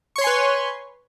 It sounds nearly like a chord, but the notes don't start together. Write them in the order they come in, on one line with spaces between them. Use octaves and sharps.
C#6 C#5 C6 G#5 B4